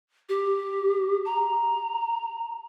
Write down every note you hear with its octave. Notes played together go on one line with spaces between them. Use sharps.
G4
A#5